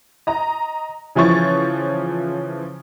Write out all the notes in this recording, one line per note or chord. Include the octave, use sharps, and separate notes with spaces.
D#5 A#5
C#3 E3 F3 C#5 C#6 A6